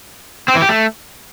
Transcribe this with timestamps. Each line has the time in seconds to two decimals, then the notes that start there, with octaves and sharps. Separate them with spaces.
0.48 C4
0.55 E3
0.62 G4
0.69 A3